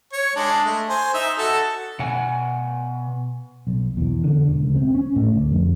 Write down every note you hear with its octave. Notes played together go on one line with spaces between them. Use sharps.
C#5
G#3 D4
A3
C5 G#5
D#4 E5
F#4 A4
B2 F#5 G#5
B1
E2
D3
E1
C#2
C4
C#4
A2
D2
F2